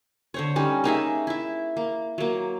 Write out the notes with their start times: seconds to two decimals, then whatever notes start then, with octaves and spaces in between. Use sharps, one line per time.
0.34 D3 C5 C#5
0.56 G3 C#4 D#4
0.84 A#3 D#4 G#4 E5
1.27 E4 E5
1.77 A#3
2.18 F#3 A#3